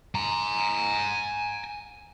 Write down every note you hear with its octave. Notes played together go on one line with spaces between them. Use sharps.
G#5 A#5